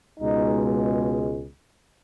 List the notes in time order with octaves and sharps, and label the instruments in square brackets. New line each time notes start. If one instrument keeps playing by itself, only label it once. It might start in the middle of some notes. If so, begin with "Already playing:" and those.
[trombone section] C#2 B2 G#3 D#4